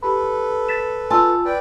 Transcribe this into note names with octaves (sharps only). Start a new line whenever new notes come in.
G4 A4 B4 B5
A6 B6 E7
F4 G#5 A5 C6 E6
B4 D5 G5